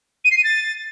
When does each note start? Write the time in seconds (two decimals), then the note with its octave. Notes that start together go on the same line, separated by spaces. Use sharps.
0.24 D#7
0.31 C7
0.37 D#7
0.44 A6